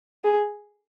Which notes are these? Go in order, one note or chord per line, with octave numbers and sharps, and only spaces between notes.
G#4